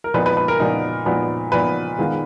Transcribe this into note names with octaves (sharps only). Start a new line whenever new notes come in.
A#4
A#2 F3 B3 D#4 B4
B4
B4
A#4
A#2 F3 B3 D#4
A#2 F3 B3 D#4
A#2 F3 B3 D#4 B4
D#3 G#3 B3 F4